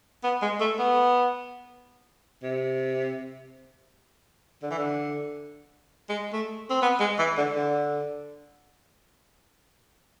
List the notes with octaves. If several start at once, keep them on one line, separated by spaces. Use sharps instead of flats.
B3
G#3
A3
B3
C3
D3
E3
D3
G#3
A3
C4
B3
G#3
E3
D3
D3